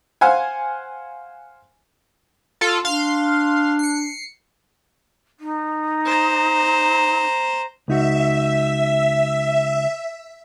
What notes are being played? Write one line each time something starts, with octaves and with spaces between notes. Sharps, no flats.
C5 F5 F#5 G#5
F4 A4
D4 F5 C6
C7 C#7
D#4
C5 A#5
C#2 D#4 F#4 E5